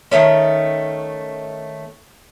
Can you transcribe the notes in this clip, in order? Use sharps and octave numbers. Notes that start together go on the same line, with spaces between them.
D#3 F#3 A3 C#4